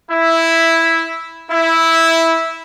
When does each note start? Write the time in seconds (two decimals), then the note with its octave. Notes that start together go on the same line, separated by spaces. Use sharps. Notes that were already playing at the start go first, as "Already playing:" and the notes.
0.11 E4
1.51 E4